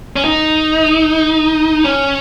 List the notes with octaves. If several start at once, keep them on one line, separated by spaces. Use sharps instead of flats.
C#4
D#4
C#4